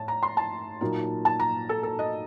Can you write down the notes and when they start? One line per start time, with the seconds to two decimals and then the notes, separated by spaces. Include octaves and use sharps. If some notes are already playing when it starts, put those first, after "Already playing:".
Already playing: A2 A5
0.08 A#5
0.23 C6
0.37 A5
0.81 A#2 F#3 A#3 D#4
1.25 A5
1.40 A#5
1.69 A4
1.83 A4
1.99 D#5